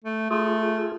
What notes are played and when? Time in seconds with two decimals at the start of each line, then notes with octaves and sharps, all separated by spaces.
0.04 A3
0.31 A3 F4 G#4